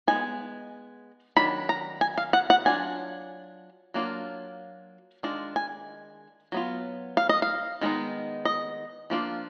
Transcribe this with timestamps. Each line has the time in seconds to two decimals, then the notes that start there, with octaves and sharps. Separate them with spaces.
0.07 G#3 B3 D#4 G#5
1.36 D#3 F#3 D4 B5
1.69 A#5
2.01 G#5
2.17 F5
2.33 F#5
2.50 F#5
2.65 F#3 D4 F4 G#5
3.94 F#3 A#3 D4 F4
5.23 D#3 G#3 D4 F4
5.56 G#5
6.52 F#3 B3 F4
7.17 F5
7.29 D#5
7.42 F5
7.81 D#3 G#3 B3 D#4
8.45 D#5
9.10 F3 A#3 D4 F4